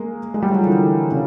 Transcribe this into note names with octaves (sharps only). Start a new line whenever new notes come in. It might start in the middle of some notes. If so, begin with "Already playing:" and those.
Already playing: G#3 A#3
G#3
G3
F#3
F3
D3 E3
C#3